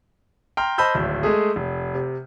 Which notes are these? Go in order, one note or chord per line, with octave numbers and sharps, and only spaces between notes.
G5 A#5 C6 F6
C5 D#5 A5 B5 E6 G6
D1 G#1
G#3 A3 G#4
F1
C3